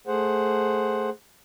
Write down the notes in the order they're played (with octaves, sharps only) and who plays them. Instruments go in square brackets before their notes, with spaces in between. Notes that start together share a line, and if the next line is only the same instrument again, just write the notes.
[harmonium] A3 G#4 C5 F#5